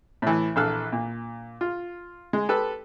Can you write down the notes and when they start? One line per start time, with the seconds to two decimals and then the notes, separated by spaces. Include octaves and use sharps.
0.22 A2 E3
0.56 A#1 E3 A4 F5 F6 F#6
0.92 A#2
1.61 F4
2.33 G#3
2.49 G4 A4 B4